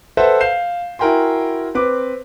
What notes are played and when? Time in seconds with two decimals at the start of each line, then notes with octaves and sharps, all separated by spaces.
0.17 A4 B4 C5 E5 F#5
0.40 F5 G6 C7 E7
0.99 E4 F#4 A#4 G5 G#5 C6
1.75 C4 B4 D6